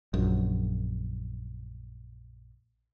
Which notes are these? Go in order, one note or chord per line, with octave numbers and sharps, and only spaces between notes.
A#1 F#2